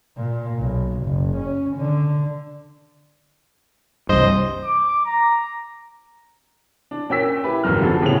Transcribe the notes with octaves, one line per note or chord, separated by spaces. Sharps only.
A#2
B1
F#1
C#4
D3
C2 G2 C5 D#5
D6
A#5
D4
A#2 C#4 G5 E6 B6
E4 G4 B4
F#1 D#2 G#2 F#3 F6
D3 F3 B3 F#4 G#4 A4
A2 C#3 G3 B3 C#4 F7